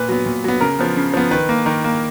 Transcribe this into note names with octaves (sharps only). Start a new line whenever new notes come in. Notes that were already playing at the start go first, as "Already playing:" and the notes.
Already playing: A#2 B4
F#3 B3
A#2
F#3 B3
C#3 A#4
F3 B3
C#3
F3 B3
D#3 B4
A#3
D#3 A#4
A#3